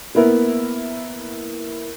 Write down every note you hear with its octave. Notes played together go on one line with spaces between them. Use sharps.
A#3 B3 E4 A#4